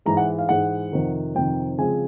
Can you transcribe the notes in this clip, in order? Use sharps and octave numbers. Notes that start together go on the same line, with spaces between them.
G#2 E3 G#3 A#5
F#5
F5
G#2 E3 G#3 F#5
F2 C3 D#3
F2 C3 D#3 G5
C#3 F3 G#3 C4 G#5